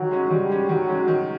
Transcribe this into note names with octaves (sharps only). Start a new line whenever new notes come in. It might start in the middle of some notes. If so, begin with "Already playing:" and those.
Already playing: D#3 F#3
G#3 C#4
D#3 G3
G#3 C#4
D#3 F#3
G#3 C#4
D#3